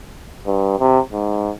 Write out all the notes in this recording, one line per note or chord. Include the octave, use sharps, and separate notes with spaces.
G2
C3
G#2